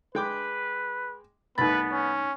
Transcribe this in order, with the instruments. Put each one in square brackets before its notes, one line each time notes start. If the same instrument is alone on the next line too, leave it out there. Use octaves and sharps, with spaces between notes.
[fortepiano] G#3 G5 D6 [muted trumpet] B4
[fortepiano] C2 A3 B5 [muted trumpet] B3 [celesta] D#4 A6 [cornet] B4
[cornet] C#4